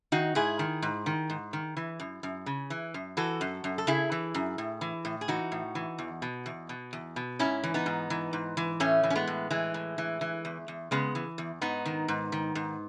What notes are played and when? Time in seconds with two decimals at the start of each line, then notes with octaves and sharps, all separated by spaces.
0.12 D#3 D#4 F#4
0.35 G#2 E4 G#4
0.59 D#3
0.82 G#2
1.06 D#3
1.30 G#2
1.53 D#3
1.77 E3
2.00 F#2
2.23 F#2
2.46 C#3
2.70 E3
2.94 F#2
3.17 E3 F#4 A4
3.41 F#2
3.64 F#2
3.78 A4
3.87 C#3 E4 G#4
4.12 E3
4.34 F#2
4.58 A2
4.81 E3
5.05 A2
5.21 G#4
5.28 E3 D#4 F#4
5.52 A2
5.75 E3
5.99 E2
6.22 B2
6.46 E2
6.69 B2
6.93 E2
7.16 B2
7.39 G#2 C#4 E4
7.64 E3
7.74 B3 D#4
7.86 G#2
8.10 E3
8.33 G#2
8.57 E3
8.80 A2 A3 C#4
9.03 E3
9.10 C#4
9.15 G#3 B3
9.27 A2
9.51 E3 G#3
9.74 A2
9.98 E3
10.21 E3
10.45 E2
10.68 E2
10.91 C#3 G#3 B3
11.15 E3
11.38 E2
11.62 G#2 B3 D#4
11.86 D#3
12.08 G#2
12.32 D#3
12.55 G#2